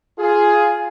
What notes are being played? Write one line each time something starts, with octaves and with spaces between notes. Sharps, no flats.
F4 G#4 G#5